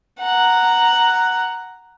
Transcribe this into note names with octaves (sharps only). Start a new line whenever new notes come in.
F#5 A#5